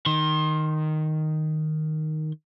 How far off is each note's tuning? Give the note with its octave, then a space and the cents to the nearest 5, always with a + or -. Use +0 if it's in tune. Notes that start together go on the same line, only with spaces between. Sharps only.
D#3 -5 C6 +30